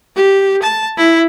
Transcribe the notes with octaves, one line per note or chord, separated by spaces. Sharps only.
G4
A5
E4